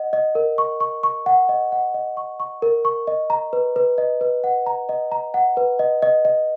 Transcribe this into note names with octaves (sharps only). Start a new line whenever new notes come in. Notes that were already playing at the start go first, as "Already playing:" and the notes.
Already playing: D#5 F#5
D#5
A#4
C#6
C#6
C#6
F#5
D#5
F#5
D#5
C#6
C#6
A#4
C#6
D#5
A#5
B4
B4
D#5
B4
F#5
A#5
D#5
A#5
F#5
B4
D#5
D#5
D#5